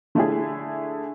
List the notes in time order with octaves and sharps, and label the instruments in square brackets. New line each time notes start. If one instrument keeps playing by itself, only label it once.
[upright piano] D3 A3 E4 G#4